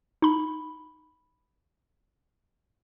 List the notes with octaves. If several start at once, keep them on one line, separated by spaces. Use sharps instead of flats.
D#4 B5